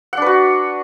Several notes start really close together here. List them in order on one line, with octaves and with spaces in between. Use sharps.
F#5 D4 B4 F#4